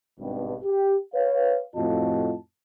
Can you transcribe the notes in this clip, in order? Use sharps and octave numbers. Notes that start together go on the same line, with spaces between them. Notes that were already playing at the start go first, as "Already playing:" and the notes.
G#1 G2 B2
G4
B4 C#5 F5
F2 A2 F4 F#4 D#5 A5